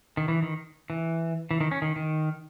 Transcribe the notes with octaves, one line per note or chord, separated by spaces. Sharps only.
D#3
E3
D#3
E3
E3
D#3
C#4
D#3
D#3